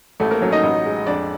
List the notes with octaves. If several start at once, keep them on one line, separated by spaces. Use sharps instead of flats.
A1 A3 A4
A#3 A#4
F#3 C#4 C#5
D#4 D#5
A1
G#3
F2 D4 D5